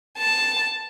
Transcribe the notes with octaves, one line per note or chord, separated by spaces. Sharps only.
A5